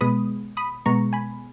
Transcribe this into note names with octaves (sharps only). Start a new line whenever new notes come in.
B2 G#3 B3 B5 D#6
B5 D#6
B2 G#3 B3 A#5 C#6
G#5 B5